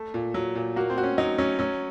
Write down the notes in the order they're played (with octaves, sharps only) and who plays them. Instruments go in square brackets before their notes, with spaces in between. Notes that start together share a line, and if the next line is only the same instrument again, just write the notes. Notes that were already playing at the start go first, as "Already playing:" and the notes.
Already playing: [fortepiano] A3
[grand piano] A#2
F#3
A#2
[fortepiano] A#3 [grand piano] F#4
[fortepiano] C4
[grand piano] F#4
[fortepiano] C#4
[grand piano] F#3 [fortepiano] D#4
[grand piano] F#3 [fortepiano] C#4
[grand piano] F#3 [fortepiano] C#4